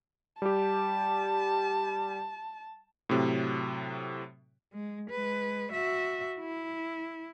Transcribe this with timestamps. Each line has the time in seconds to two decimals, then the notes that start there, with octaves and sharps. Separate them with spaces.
0.42 G3 G4 A5
3.09 A2 C3 F#3
4.73 G#3
5.10 G#3 B4
5.72 F#4 E5
6.40 E4